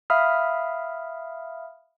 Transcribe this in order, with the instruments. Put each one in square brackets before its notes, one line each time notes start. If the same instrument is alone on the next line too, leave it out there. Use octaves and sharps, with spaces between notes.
[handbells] E5 F5 B5 D#6 F6